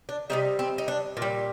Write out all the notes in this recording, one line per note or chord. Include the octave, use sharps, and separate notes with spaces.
D4
C3 D#3 G3 D#4
C4
D#4
D4
A#2 F4
G3